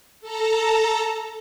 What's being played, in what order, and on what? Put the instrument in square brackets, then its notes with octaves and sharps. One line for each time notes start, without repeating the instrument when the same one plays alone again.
[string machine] A4 A5 A#5